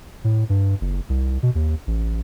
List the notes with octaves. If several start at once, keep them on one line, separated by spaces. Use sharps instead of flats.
A2
G2
F#1
C2
B2
D#2
A1